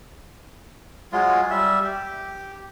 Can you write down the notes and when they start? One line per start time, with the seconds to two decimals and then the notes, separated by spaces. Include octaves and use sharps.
1.12 F#3 G#3 F4
1.50 G3 E5
1.84 G4